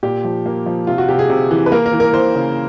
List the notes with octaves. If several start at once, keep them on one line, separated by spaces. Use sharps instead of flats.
A#2 G4
F3
A#3
F3
C3 F4
F#4
C3 G4
G#4
C3
E3
B4
A#3 A#4
A#4
E3
A#4
E3 C5
C#3